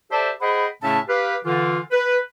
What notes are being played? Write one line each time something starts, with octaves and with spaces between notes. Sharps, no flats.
G4 A4 C5 D5 E5 A5
G#4 C5 D#5 F#5 G5 B5
A2 C#3 A3 C#4 E5 A5
G4 B4 F5
D3 E3 F4
B4